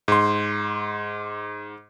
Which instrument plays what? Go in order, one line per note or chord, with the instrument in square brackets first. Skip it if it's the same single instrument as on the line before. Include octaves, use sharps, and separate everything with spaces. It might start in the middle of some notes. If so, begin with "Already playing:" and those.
[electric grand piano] G#2 C6